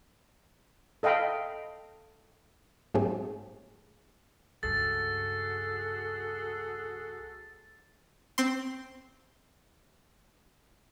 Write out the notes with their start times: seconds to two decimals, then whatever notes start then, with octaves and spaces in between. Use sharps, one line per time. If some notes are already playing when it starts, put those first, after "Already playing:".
1.03 A4 D#5 F5 G5 B5
2.94 G#2 F#3 A3 C4 G4 G#4
4.63 C#2 G2 F#4 G#4 A4 A6
8.38 C4 C6